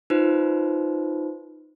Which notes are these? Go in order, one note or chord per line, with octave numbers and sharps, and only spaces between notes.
D#4 F4 B4 C5